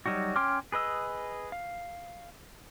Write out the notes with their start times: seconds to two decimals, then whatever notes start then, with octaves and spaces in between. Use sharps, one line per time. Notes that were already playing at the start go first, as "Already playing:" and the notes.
0.06 F#3 G3 D#4 F#4
0.36 C#4 G5 C6 D6 F6
0.72 G#4 B4 D#5 E6
1.52 F5